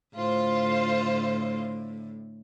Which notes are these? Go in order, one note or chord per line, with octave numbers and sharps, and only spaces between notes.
A2 D3 F4 C5